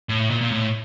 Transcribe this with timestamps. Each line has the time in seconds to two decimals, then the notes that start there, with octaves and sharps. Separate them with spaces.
0.09 A2
0.30 A#2
0.41 A#2
0.52 A2